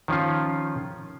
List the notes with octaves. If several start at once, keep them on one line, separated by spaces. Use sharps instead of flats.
D#3 F3 C#4 F4